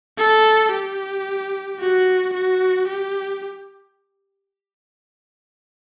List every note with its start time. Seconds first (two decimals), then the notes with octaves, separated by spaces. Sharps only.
0.19 A4
0.73 G4
1.80 F#4
2.34 F#4
2.88 G4